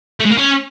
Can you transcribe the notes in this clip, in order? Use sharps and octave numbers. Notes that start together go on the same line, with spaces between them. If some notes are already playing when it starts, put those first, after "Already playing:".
A3
G#3
A#3
C#4